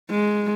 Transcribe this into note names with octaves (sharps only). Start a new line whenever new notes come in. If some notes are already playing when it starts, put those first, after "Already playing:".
G#3